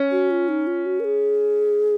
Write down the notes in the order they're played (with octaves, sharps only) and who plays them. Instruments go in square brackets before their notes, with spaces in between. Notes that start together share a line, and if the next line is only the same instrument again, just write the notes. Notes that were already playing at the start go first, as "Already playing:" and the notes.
Already playing: [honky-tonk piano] C#4
[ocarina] F#4
F4
D#4
F4
F#4
A#4
G#4